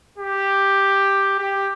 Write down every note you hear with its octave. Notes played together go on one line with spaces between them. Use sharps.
G4
G4